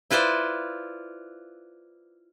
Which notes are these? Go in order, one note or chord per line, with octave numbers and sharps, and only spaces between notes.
E4 F4 B4 C5 D5